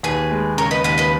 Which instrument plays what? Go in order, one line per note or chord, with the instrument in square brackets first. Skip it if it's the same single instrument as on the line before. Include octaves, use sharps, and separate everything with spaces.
[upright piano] D#2 [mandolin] G#4 B4
[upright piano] G#3
[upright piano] C#3 [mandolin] A#4 C#5
[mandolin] B4 D#5
[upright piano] D#2 [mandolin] B4 D#5
[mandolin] B4 D#5